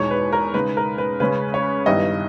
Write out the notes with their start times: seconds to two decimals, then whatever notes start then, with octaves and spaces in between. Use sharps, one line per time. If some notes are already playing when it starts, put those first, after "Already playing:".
Already playing: E2 B2 G#3 D#4 C#5
0.11 B4
0.33 A#4
0.54 C#3 G#3 D#4 B4
0.77 A#4
0.98 B4
1.20 C#3 G#3 C#4 B4
1.54 C#5
1.86 G2 D#3 G3 B3 E4 D#5